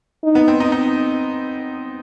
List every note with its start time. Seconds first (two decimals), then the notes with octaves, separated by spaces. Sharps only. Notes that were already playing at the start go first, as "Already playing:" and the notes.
0.23 D#4
0.35 B3
0.48 C4
0.60 D#4
0.72 D#4